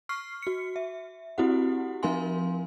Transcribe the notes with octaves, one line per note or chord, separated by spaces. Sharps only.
C#6 F6 C7
F#4 C#7
E5
C4 E4 F#4 G4 F#5
F3 C4 A#4 F5 G#5 C6